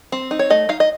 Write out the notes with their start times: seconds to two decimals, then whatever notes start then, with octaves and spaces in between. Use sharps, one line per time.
0.12 C4
0.31 D#4
0.39 C#5
0.50 A3 D#5
0.69 D#4 F5
0.80 D#5